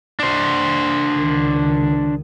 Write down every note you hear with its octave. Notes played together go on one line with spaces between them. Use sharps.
D4 C5
C#2 D#3